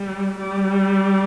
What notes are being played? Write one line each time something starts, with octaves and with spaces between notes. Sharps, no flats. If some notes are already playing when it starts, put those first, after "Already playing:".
Already playing: G3
G3